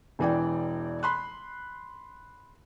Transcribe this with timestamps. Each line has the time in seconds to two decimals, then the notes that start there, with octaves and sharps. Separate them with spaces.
0.19 E1 E3 D5 G5
1.03 B5 C6 F#6